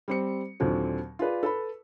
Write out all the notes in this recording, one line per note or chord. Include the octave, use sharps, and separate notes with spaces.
G3 C4 C#7
D#2 A#2 D3 F#3 C4
F4 G#4 B4 D5
A4 B4 B5